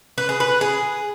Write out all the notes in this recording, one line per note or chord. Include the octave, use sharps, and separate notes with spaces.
B4
G#4
B4
G#4